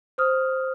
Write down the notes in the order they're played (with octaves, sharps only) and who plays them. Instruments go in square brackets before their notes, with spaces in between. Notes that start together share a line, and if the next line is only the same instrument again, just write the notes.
[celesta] C5 D#6 F6